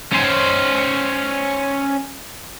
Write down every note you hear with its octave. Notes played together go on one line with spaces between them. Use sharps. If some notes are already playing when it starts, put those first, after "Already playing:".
C#4 C5